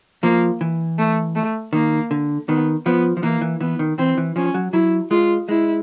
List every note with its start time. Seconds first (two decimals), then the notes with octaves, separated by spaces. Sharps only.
0.23 F3 A#3
0.61 E3
0.98 A3
1.35 A3
1.73 D#3 A#3
2.11 D3
2.48 D#3 B3
2.86 F3 B3
3.17 F3
3.23 E3 A#3
3.41 E3
3.60 E3 B3
3.79 D#3
3.98 E3 C4
4.18 E3
4.36 F3 C#4
4.54 F#3
4.73 F#3 E4
5.11 G#3 F4
5.48 G#3 E4